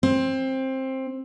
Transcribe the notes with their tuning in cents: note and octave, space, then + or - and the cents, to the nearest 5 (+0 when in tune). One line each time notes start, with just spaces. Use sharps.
C4 +15